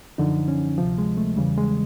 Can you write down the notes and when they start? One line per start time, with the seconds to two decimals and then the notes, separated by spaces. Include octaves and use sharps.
0.18 F#2 D3 F3 D#4
0.48 C#4
0.78 D2 C3 F3
0.98 G#3
1.17 A3
1.37 E2 C#3 E3 G3
1.57 G#3